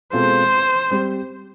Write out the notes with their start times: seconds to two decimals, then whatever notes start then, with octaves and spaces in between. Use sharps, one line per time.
0.13 B2 G#3 C4 F4 A4 C5
0.91 G3 C4